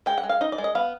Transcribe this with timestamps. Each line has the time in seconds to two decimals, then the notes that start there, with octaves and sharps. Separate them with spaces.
0.06 G#3 G5
0.18 F#5
0.23 G#3
0.29 F5
0.41 D#4 D#5
0.52 D5
0.58 G#3
0.64 D#5
0.75 B3 F5